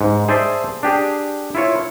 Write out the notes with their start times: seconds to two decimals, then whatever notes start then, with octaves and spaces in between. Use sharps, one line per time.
0.01 G#2
0.28 G#4 C5 D5 E5 A5
0.83 D4 G4 G#4
1.55 E4 F4 C#5